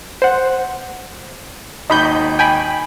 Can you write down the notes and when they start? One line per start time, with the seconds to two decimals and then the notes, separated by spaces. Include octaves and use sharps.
0.22 C5 F#5
1.90 G#1 D#2 D#4 D#5 B5 G6
2.39 G5 G#5 B5